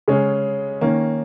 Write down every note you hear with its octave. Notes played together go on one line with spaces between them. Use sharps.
C#3 G#3 C#4
D#3 A#3 C#4